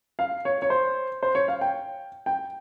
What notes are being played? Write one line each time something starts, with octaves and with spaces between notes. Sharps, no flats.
F5
C#5
C#5
C5
C5
C#5
F5
G5
G5